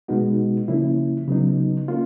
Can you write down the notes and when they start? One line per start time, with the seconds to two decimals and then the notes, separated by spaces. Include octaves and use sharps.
0.08 B2 G#3 B3 D#4 F#4
0.68 C#3 F3 A#3 C#4 E4
1.28 C#3 F#3 B3 D#4
1.88 A#3 C#4 F4